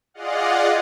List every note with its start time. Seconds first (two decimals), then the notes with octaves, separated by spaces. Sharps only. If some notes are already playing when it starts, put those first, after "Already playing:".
0.14 F4 G#4 D5 D#5 F5 F#5